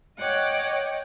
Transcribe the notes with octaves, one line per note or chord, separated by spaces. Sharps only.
C#5 D#5 F#5 G5 D6